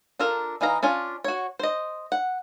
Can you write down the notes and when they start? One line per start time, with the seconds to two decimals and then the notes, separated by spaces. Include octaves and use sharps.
0.19 D4 F4 A4 A#4
0.61 E3 D#4 F5 A#5
0.83 C#4 D4 F4
1.24 F#4 C#5
1.59 C5 D#5
2.12 F#5